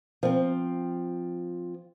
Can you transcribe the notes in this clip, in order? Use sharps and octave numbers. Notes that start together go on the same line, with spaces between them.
F3 C4